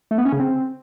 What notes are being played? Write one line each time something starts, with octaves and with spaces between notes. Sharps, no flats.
A3
B3
C#4
C#3
C4